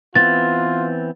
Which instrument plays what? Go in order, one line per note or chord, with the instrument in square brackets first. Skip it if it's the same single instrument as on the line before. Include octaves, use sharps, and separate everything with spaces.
[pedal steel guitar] E3 B3 C4 [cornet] F4 [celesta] A6